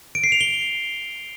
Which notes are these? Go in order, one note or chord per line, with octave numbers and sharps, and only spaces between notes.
D7
C7
F7
G7